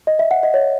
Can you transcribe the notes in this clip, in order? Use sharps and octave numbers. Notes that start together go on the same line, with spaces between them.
D#5
E5
F#5
D#5
C#5